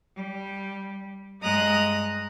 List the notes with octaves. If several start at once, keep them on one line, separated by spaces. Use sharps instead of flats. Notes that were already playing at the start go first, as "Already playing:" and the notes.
G3
G2 G#3 D#5 A#5 D#6 F#6